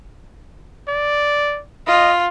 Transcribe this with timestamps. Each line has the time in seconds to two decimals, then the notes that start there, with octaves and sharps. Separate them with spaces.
0.88 D5
1.87 F4 D#5